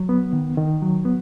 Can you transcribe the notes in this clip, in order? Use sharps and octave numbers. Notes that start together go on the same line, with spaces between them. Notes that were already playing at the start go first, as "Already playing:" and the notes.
Already playing: F#3
B3
D#3
D#3
F#3
B3